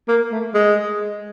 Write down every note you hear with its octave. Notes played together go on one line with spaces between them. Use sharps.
A#3
A3
G#3